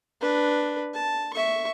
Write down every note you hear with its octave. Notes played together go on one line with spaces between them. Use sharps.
D4 B4
A5
E5 C#6